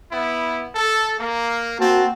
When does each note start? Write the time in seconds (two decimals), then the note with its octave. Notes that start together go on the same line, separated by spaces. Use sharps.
0.12 B3 E4
0.75 A4
1.19 A#3
1.79 A#3 C4 F#4 A5